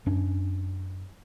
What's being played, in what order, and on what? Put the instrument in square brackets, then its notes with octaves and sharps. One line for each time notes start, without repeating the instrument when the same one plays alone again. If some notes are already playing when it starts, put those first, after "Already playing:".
[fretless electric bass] F#2 C#4 D4